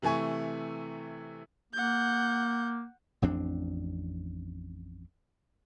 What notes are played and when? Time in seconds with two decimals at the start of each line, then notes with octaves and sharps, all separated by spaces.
0.02 C3 E3 A3 G#5 C#6
1.73 A#3 F#5 G6
3.22 A1 F2 C4 D4